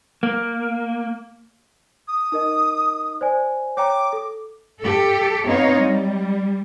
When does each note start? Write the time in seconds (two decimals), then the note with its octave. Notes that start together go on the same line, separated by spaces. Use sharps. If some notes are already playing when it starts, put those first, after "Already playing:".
0.23 A#3
2.08 D#6
2.32 D#4 A#4 D#5
3.21 C5 D5 G#5
3.77 C#5 G5 A#5 D6
4.13 A4
4.82 G4 A4
5.46 B3 C4 D#4 C#5 F5
5.78 G3